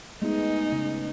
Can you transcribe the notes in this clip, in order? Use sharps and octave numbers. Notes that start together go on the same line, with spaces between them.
G#3 A3 B3 D#4
C#3